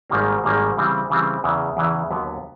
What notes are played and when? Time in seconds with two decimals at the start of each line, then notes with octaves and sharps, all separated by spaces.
0.10 G#1 G#2 D#3 G3 A#3
0.44 G#1 G#2 D#3 G3 A#3
0.77 C#3 E3 G3 C4
1.10 C#3 E3 G3 C4
1.44 E2 C#3 E3
1.77 E2 C#3 E3
2.10 D#2 D3 F#3 B3